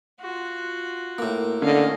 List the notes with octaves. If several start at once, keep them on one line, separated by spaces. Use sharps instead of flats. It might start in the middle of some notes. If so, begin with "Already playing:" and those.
F4 F#4
A2 A#3
D3 C#4 D#5 F5